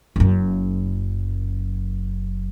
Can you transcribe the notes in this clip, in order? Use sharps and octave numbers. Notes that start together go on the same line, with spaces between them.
F#1 F#2